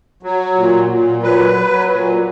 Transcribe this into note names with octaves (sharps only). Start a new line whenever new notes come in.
F#3
A#2
A#2
F#3 B4
F#3
A#2